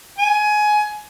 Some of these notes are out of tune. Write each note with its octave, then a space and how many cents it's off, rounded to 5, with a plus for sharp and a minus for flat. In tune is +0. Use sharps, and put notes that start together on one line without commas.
G#5 +20